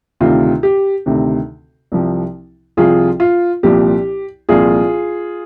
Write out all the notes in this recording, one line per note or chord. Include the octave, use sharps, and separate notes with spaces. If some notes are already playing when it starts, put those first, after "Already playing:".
D2 C3 D#3 F4
G4
D2 C3 D#3
C2 C3 F3
C2 C3 F3 F4 G#4
F4
C2 A#2 F3 G4
C2 A#2 F3 F4 G#4